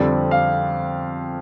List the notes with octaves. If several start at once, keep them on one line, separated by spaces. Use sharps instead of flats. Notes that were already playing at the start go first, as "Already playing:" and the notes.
Already playing: F2 D3 G3 C4 D5
F5